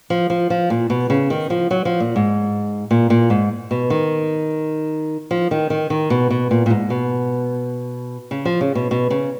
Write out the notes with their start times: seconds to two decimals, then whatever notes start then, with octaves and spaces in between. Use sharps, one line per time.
0.10 F3
0.30 F3
0.50 F3
0.70 A#2
0.90 B2
1.10 C#3
1.30 D#3
1.50 F3
1.71 F#3
1.85 F3
2.00 A#2
2.16 G#2
2.91 A#2
3.10 A#2
3.30 G#2
3.71 B2
3.90 D#3
5.31 F3
5.51 D#3
5.70 D#3
5.90 D#3
6.10 B2
6.31 B2
6.51 A#2
6.66 A#2
6.70 G#2
6.90 B2
8.31 C#3
8.45 F3
8.61 C#3
8.75 B2
8.91 B2
9.11 C#3